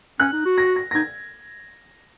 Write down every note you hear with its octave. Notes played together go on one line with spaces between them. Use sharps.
C#4 F#6
D#4
F#4
A#6
A#6
A#6
D#4 G#6